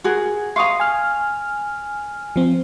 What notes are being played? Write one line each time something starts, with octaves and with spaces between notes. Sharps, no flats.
F#4 G#4 A#4
F5 A#5 C6 C#6 D#6
G#5 F6
F3 C4